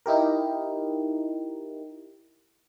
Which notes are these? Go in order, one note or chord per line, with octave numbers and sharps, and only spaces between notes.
D#4 E4 G4 A#4